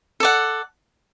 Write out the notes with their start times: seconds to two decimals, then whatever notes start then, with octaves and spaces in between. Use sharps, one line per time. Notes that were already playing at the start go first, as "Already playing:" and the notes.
0.20 A4 D5 F#5